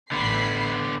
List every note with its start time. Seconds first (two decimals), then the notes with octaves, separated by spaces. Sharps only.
0.12 A1 D3 B3 B5 C7